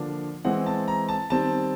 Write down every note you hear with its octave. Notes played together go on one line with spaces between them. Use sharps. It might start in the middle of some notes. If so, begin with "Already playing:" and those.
Already playing: D3 F3 A#3 D4
E3 G#3 C4 F#5
A5
A#5
A5
D#3 G3 C4 A5